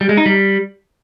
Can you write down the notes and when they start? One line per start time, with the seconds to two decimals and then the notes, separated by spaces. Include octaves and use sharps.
0.01 G3
0.09 G#3
0.17 D#4
0.26 G3